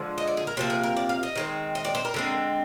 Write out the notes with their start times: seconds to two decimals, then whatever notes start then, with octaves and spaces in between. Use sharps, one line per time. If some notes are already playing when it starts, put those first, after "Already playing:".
Already playing: D3 F3 G#3
0.18 D#5
0.28 D5
0.37 G#4
0.47 A#4
0.57 C3 F3 A#3 C5
0.70 G#4
0.83 A#4
0.97 D5
1.09 F5
1.23 D#5
1.35 D#3 G#3 C4
1.75 D#5
1.85 D5
1.95 C5
2.05 A#4
2.14 D3 G#3 C4